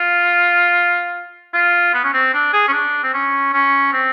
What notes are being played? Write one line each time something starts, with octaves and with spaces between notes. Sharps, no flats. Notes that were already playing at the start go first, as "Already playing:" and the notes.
Already playing: F4
F4
B3
C#4
C4
D4
G#4
C#4
D4
C4
C#4
C#4
C4